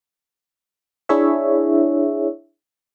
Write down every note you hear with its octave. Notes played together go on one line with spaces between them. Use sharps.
D4 E4 G#4 C#5 E5